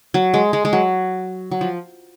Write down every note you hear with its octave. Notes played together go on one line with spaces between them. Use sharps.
F#3
G#3
G#3
G#3
F#3
F#3
F3